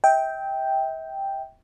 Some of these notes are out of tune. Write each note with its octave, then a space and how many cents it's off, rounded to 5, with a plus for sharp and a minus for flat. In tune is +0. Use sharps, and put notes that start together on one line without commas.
E5 -40 G5 +0